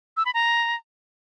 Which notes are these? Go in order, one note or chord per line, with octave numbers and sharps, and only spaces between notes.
E6
B5
A#5